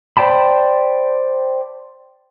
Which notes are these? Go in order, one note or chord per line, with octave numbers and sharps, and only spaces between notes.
C5 D5 G5 A5 B5